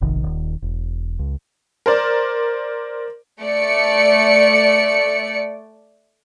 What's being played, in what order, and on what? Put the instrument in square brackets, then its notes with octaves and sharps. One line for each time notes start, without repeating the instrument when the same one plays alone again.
[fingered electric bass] F1 A#1 C3 D#3
D#1 D#3
E1
C#2
[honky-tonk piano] A#4 C5 D5
[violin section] A3 D5 C#7